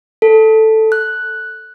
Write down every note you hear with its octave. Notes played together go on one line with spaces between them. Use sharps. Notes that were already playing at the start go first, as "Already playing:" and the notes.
A4
F#6